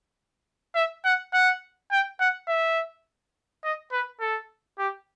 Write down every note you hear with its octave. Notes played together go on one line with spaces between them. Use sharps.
E5
F#5
F#5
G5
F#5
E5
D#5
B4
A4
G4